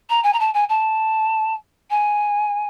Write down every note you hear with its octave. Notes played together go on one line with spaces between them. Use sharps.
A#5
G#5
A#5
A5
G#5
A5
G#5